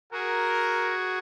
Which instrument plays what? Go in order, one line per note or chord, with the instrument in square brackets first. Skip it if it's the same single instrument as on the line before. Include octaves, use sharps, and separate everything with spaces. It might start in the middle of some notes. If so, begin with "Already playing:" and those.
[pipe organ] F#4 G#4 [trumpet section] A#4